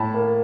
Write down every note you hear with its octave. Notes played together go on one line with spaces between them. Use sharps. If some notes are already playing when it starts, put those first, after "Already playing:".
Already playing: A2 A5 B5
A#3